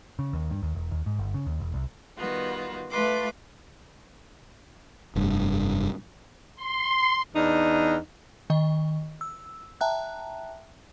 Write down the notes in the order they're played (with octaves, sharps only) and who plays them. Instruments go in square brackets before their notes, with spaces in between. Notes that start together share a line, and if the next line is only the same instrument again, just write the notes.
[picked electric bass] C#3
D#2
G2
D#2
E1
D#2
G#2
G1
C#3
D#2
E1
C2
[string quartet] D#3 G3 B3 F4 F#4
A3 F4 B4 C6 D6
[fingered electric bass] F1 G2
[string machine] C6
[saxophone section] E2 D4 D#4
[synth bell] D#3 D#5
E6
E5 G5 A5 A#5 F#6